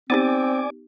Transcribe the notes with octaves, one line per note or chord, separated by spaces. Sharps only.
B3 C4 D#4 G4 D5 G#5 D6